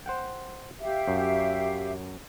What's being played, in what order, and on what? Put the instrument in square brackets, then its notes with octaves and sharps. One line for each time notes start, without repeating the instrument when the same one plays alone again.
[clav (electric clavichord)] C5 F#5 G5
[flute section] G4 E5 F5
[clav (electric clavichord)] F#2